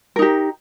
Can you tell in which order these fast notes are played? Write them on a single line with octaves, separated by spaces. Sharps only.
A#4 D#4 G4